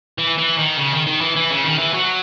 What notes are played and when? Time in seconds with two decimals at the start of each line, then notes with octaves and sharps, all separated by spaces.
0.18 E3
0.38 E3
0.58 D#3
0.77 C#3
0.92 D#3
1.07 D#3
1.21 E3
1.36 E3
1.50 C#3
1.65 D#3
1.79 E3
1.94 F#3